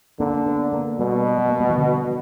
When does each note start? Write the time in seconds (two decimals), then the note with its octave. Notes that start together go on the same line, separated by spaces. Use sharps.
0.20 D3 A#3
0.46 B3
0.73 A#3
0.99 B2 G3
1.38 G3
1.50 A#3
1.60 G3
1.69 E3
1.78 D3